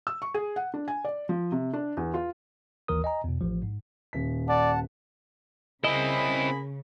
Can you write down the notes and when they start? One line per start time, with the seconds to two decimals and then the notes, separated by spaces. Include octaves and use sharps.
0.07 E6
0.22 C#6
0.34 G#4
0.56 F#5
0.74 D4
0.88 G#5
1.05 D5
1.29 F3
1.52 C3
1.73 D4
1.97 E2
2.14 F4
2.88 G#1 D#2 E3 A#4 D#6
3.04 D#5 G#5 A#5
3.24 E2 B2
3.41 A1 F3
3.63 G#2
4.13 D#1 B6
4.49 D5 F#5 A5
5.84 C#3 A#3 C4 E4 G#4 D#5 B5